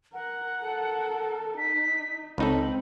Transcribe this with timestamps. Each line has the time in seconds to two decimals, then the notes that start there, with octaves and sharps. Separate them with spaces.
0.14 A#4 F#5
0.64 A4 A#4
1.58 D#4 B6
2.38 C#2 C4 D#4 A4 B5